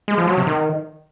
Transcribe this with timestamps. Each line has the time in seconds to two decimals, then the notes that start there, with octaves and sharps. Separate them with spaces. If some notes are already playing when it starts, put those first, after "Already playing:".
0.08 G#3
0.18 F3
0.27 F#3
0.37 C3
0.47 D#3